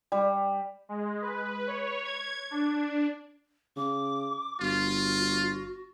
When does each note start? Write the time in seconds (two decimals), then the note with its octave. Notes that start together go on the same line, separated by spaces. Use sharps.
0.12 G3
0.89 G#3
1.22 B4
1.67 C#5
2.05 G#6
2.51 D4
3.77 C#3 D6
4.61 G1 F4 F#4